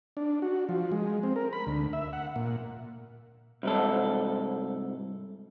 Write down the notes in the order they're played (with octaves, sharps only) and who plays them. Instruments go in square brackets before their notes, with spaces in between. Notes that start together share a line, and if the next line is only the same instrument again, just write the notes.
[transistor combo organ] D4
F#4
F3
G#3
C4
A#4
B5
D2
E5
F#5
A#2
[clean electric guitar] C2 G#2 A4